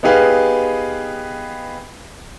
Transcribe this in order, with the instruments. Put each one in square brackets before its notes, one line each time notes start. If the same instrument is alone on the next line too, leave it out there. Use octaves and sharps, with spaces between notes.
[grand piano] B3 D#4 G4 G#4 B4 F5